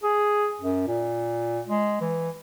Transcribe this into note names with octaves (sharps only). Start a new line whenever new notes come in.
G#4
F#2
A#2
G#3
E3